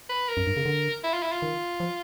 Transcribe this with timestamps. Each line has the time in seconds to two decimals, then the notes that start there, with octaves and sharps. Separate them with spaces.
0.09 B4
0.29 A#4
0.37 F#2
0.47 G2
0.57 C#3
0.66 D3
1.04 E4
1.13 F4
1.23 E4
1.32 F4
1.42 D#3
1.80 F3